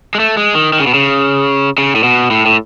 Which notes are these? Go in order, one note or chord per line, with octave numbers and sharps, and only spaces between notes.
G#3
A3
G#3
D#3
D#3
C#3
B2
C#3
C#3
A2
B2
A2
A2